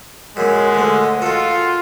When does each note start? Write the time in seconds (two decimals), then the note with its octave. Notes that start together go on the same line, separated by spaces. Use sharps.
0.37 F#2 A#2 G#3
0.75 D2 D3
1.22 F4 F#4 A4